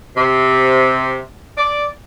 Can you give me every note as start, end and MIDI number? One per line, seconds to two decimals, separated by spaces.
0.17 1.20 48
1.58 1.86 74